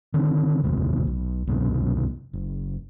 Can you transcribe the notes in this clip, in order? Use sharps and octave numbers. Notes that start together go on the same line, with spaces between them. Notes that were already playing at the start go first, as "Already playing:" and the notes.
D3 D#3 C4
F1 A#1 D#2 C3
B1
C2 F#2 B2
F#1